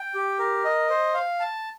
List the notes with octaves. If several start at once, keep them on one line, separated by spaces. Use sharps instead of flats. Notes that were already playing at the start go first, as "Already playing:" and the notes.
Already playing: G5
G4
A#4
D#5
C5
F5
A5